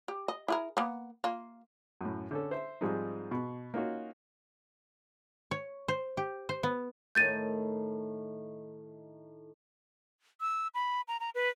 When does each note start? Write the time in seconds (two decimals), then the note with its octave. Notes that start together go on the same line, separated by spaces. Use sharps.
0.08 G4
0.28 D#5
0.48 E4 G#4 A#4
0.77 A#3 B3
1.24 A#3 F4
2.01 F#2 A2
2.31 D3 C#4 A4
2.51 C5 E5
2.81 G#2 F3 G3 G#3 C4 D#4
3.31 B2
3.74 A#3 C#4 D#4 F4 F#4
5.51 C#5
5.88 C5
6.17 G4
6.49 C5
6.63 B3
7.15 A2 D#3 G6 A6 D#7
10.41 E6
10.75 B5
11.08 A#5
11.20 A#5
11.35 B4